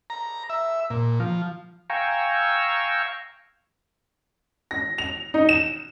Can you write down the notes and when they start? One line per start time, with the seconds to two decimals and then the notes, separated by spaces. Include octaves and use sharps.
0.10 A#5
0.50 E5
0.90 A#2
1.20 F3
1.90 F5 G5 G#5 A#5 C#6 E6
4.71 A#6
4.98 F7
5.34 D#4
5.49 E7